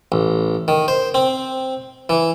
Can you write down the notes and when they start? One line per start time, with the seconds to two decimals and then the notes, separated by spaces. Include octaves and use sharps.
0.12 A1
0.68 D#3
0.88 C5
1.14 C4
2.09 E3